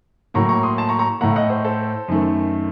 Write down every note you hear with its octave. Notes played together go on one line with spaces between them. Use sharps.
A2 F#3 A#3 A#5 C#6
A#5 C#6
C6 D#6
A5 C6
A#5 C#6
A#5 C#6
A2 A3 F#5 A#5
F5
D#5 F#5
C5 D#5
A4 C5
F#2 D#3 A3